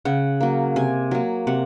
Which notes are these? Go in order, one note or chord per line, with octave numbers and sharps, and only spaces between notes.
C#3 F#5
F#3 A#3
C3 G#5
F#3 A#3
C3 F#5